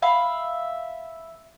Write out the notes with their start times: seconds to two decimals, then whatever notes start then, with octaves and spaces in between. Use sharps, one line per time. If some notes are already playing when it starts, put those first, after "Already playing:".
0.02 E5 F5 B5